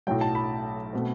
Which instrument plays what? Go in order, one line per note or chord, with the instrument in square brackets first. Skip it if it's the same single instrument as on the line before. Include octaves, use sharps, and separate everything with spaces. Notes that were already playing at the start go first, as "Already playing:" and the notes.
[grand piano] B1 A2 F#3 A3 G5
A5
B5
B2 A3 C4